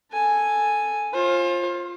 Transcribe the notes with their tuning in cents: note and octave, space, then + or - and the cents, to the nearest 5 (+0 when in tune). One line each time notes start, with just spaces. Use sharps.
A4 +0 G#5 +0
F4 +0 C5 +35